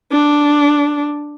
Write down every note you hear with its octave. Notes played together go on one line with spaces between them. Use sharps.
D4